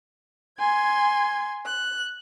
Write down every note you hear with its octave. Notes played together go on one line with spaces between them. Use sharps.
G#5 C6 G#6
F#6